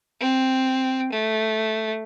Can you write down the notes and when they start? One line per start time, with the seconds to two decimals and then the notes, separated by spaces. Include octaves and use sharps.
0.20 C4
1.13 A3